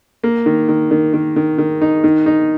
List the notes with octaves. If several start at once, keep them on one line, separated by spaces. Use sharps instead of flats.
A#3
D#3
D#3
D#3
D#3
D#3
D#3
D#4
D#3
D#4